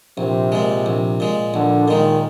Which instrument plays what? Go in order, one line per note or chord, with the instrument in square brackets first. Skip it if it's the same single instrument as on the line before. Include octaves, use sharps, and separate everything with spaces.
[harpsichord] A#1 [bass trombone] C3
[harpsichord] A#2 G#3
A#1
A#2 G#3
[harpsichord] A#1 [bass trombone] D3
[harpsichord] A#2 G#3 [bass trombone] D#3